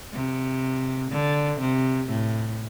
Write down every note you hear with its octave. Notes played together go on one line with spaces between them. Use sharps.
C3
D3
C3
A2